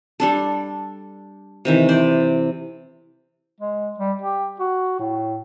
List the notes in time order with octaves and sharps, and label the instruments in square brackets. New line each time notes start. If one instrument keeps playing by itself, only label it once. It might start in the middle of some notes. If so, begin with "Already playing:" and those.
[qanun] G3 D4 A4
C3 D#3 E3
C5 D5
[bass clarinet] G#3
G3
G4
F#4
A2